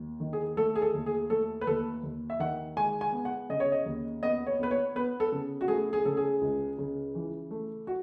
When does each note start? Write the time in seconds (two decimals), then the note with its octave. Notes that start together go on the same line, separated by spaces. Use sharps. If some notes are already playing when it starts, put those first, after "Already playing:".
Already playing: D#2
0.20 D#3
0.33 G#4
0.57 A3 A4
0.76 G#4
0.82 A4
0.94 D#2
1.06 G#4
1.30 A3 A4
1.61 B4
1.67 D#2 A4
2.03 D#2
2.30 E5
2.40 D#3 F#5
2.77 G#3 G#5
3.01 G#5
3.12 B3
3.25 F#5
3.49 C#3 D#5
3.60 C#5
3.72 D#5
3.86 D#2
4.23 B3 D#5
4.47 C#5
4.59 B3 B4
4.71 C#5
4.96 B3 B4
5.20 A4
5.32 C#3
5.61 F#4
5.68 A3 G#4
5.93 G#4
6.05 C#3 A4
6.17 G#4
6.41 C#2
6.78 C#3
7.15 E3
7.51 A3
7.87 F#4